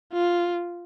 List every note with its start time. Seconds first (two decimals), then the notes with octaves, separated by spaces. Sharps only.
0.13 F4